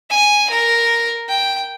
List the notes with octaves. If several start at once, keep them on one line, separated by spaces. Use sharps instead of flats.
G#5
A#4
G5